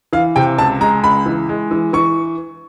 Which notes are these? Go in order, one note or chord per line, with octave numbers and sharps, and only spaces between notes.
E3 F5
C3 G5
C#2 A5
G#3 A#5
C#2 B5
E3
G#3
E3
E3 C#6